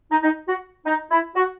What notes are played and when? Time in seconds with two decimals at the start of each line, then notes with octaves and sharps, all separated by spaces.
0.11 D#4
0.23 D#4
0.49 F#4
0.86 D#4
1.10 E4
1.35 F#4